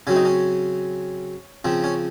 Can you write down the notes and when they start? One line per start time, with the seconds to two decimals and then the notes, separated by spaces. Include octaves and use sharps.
0.07 C#3 F#3 C4 C#4
0.16 D#4
0.25 C#4
1.65 C#3 F3 C4
1.84 C#4